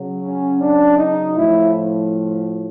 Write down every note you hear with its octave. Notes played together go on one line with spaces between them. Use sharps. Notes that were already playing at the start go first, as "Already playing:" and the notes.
Already playing: C#3 F#3
C#4
D4
D#4
A2 F3 E4